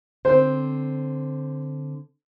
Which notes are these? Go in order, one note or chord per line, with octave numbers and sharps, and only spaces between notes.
D3 C4 C5